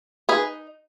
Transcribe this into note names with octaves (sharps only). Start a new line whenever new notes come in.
D#4 G#4 B4